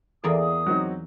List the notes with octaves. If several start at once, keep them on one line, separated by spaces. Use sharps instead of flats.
E2 A#3 G#4 D5 D#6
D#6
F#3 C4 D#4